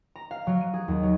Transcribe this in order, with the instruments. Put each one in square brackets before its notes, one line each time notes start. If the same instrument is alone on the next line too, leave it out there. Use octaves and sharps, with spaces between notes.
[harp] A#5
F5
F#3
D#7
G#4
D#2
F#3